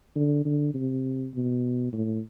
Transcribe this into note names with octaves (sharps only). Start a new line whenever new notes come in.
D3
D3
C3
B2
A2